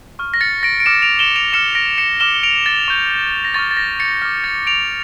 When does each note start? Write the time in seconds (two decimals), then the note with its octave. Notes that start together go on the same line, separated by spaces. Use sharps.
0.19 C#6 F6
0.34 A#6
0.41 A6 C#7
0.63 A#6 D7
0.80 D7
0.86 D6 F6 C#7 E7
1.02 D7 F7
1.19 E7 G7
1.36 D7 F7
1.53 D6 F6 C#7 E7
1.75 A#6 D7
1.98 C#7 E7
2.20 D6 F6 E7 G7
2.34 G7
2.43 D7 F7
2.66 A6
2.88 C#6 G6
3.44 A#6
3.54 C#6 F6 A6
3.71 A6
3.77 A#6
4.00 A6 C#7
4.22 D6 F6 A#6
4.44 A6
4.67 D7 F7